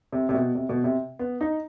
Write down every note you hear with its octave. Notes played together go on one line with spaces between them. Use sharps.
C3
C3
B2
C3
B2
C3
B3
D#4